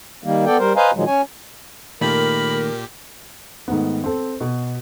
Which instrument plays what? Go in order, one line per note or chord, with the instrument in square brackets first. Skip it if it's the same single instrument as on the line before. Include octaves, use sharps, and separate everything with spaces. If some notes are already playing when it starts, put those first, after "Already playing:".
[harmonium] D#3 G3 A#3
B3 A4 D5 G5
G3 A#4 C5
B4 C5 D#5 F5 G#5 A#5
A#2 D#3 F3 F#3 G#3
C#4 C#5 G#5
[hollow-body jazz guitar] D#2 D#3 A3 [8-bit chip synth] A#2 G4 [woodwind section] A#4 [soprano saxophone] B5
[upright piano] G#2 D#3 A3 B3
C4 A4
B2